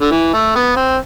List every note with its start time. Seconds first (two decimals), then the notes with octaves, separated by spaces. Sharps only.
0.02 D3
0.11 E3
0.34 A3
0.56 B3
0.77 C4